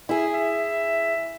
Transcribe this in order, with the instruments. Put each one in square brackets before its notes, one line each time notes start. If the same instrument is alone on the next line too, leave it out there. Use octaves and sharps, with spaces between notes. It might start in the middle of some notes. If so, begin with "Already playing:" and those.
[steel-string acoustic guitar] E4 G#4 [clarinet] E5
[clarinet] E5